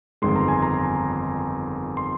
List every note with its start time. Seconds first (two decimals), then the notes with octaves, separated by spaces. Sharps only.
0.22 G1 F2 D#3 G#3 C6
0.36 A#5
0.48 G#5
0.62 A#5
1.97 C6